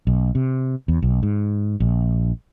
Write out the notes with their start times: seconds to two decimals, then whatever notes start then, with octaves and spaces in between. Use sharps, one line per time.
0.07 B1
0.35 C3
0.88 E2
1.02 B1
1.23 G#2
1.80 A#1